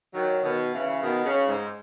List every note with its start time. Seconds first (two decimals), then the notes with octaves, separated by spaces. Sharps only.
0.14 D#3 F#3
0.44 B2 D#3
0.74 C#3 E3
1.02 B2 D#3
1.25 C#3
1.47 G#2